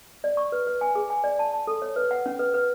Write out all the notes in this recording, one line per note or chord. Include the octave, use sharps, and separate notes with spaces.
D5
C#6
B4
B4
G#5
G#4
G#5
D5
A5
A5
A4
C#5
B4
F#5
C#4
B4
B4